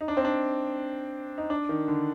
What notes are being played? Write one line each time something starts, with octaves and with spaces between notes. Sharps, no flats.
D#4
D4
C4
D4
D#4
D4
D#3
D3